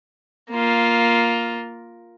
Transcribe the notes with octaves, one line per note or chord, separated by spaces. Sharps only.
A#3 F4